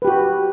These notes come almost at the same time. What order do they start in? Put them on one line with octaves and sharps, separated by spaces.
B4 G4 F#4